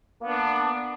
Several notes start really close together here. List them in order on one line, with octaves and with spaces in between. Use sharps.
A#3 B3 D4